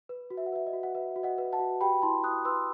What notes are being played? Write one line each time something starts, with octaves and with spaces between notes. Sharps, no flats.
B4
F#4
E5
F#5
B4 E5
D#5
F#4
F#5
B4 E5
F#4
D#5 F#5
B4
F#5 A5
F#4
G4 G5 B5
E4 A5 C6
E4 D#6 F#6
B4 C6 E6